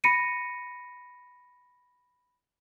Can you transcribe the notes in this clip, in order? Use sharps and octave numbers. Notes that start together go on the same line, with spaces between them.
B5 A#6 C#7 D#7